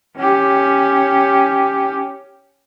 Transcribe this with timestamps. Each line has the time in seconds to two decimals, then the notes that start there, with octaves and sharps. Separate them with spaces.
0.17 C#4 G4